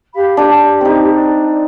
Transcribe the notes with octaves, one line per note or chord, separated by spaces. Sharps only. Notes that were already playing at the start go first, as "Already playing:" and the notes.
G4 F5 B5
D4 G4 G5
C4 D#4
D4